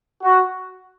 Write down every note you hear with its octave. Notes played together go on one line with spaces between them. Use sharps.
F#4